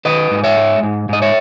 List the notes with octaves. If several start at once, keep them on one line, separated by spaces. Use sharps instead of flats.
D#3 B4 D#5
G#2
C#5 E5
G#3
G#2
G#2 D#5
C#5 E5